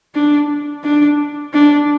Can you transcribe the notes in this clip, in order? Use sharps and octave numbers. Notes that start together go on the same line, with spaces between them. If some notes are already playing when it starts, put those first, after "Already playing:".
D4
D4
D4